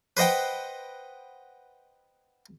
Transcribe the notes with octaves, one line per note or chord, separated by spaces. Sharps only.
B4 C5 D#5 F#5 G5